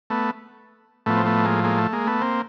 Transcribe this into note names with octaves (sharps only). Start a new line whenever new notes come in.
A3 B3
A2 F3 A3 B3
C4
A3 B3
G#3 A#3
G#3 A#3
A3
G#3 A#3
A3 B3
A#3 C4